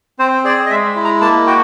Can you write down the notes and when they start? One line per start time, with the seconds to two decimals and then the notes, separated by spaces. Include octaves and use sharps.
0.19 C4 C5
0.44 G#4 D5
0.66 D#5
0.70 G#3 E5
0.95 E4
1.05 A#5
1.21 A#3 A5
1.47 F#4 G5